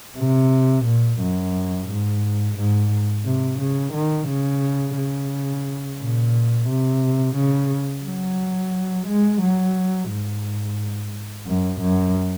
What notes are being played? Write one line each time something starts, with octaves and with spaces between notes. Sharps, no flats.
C3
A#2
F#2
G#2
G#2
C3
C#3
D#3
C#3
C#3
A#2
C3
C#3
F#3
G#3
F#3
G#2
F#2
F#2